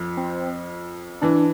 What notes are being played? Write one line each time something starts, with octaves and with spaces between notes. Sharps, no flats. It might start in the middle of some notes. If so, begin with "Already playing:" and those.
Already playing: F2 F3
C4
E3 D4